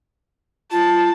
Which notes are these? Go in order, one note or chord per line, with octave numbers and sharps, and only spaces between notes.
F4 A5